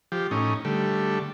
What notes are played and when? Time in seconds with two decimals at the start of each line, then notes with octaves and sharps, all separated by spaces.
0.12 F3 G4
0.31 A2 C#4 D#4
0.65 D3 G3 A3